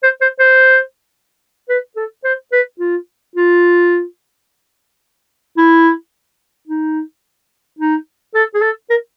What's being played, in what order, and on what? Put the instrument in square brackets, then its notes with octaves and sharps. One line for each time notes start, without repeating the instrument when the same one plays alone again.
[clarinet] C5
C5
C5
B4
A4
C5
B4
F4
F4
E4
D#4
D#4
A4
G#4
A4
A#4